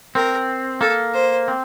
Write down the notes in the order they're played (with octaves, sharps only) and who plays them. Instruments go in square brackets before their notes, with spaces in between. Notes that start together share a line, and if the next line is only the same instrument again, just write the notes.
[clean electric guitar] C4 [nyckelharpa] A#4
[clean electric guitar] A#3 [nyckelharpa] A4
[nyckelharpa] C5
[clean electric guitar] C4